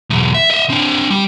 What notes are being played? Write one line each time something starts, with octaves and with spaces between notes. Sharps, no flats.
B1 E2
E5
D#5 E5
C4 D4
G3